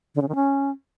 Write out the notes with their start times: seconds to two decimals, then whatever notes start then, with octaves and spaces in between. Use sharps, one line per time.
0.15 D3
0.22 C#3
0.28 D#3
0.35 C#4